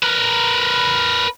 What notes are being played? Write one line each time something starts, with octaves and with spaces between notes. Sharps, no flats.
A#4 B4